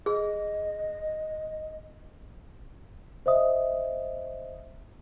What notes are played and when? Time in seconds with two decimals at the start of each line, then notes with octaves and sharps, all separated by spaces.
0.06 G#4 D#5
3.26 C5 D#5 E5 D#6